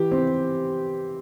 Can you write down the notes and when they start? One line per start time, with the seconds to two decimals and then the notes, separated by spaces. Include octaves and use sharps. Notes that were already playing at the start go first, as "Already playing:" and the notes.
Already playing: E3 G4
0.12 C4